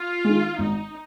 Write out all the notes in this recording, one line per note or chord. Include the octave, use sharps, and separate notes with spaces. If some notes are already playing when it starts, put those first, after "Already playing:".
Already playing: F4
D#3 G#3
G#1 D#4